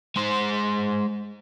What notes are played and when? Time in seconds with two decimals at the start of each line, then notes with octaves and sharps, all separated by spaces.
0.16 G#3 C5